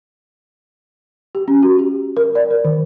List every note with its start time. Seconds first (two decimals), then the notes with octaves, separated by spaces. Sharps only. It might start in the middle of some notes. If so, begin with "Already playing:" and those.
1.35 G4
1.48 C#4
1.63 F#4
1.79 G4
2.17 A#4
2.35 D5
2.50 A#4
2.65 D#3